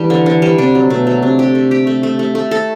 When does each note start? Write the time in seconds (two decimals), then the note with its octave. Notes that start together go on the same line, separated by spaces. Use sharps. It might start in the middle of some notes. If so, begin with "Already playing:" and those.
Already playing: E3 G3 D4
0.10 D3
0.26 D3
0.42 G3
0.58 C3 D4
0.75 F#3
0.90 B2 A3
1.07 F#3
1.23 C3 D4
1.39 G4
1.55 A3
1.71 G4
1.87 A3
2.03 A3
2.19 A3
2.35 A3
2.51 A4